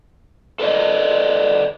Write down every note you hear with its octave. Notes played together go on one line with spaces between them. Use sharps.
A4 B4 D5 D#5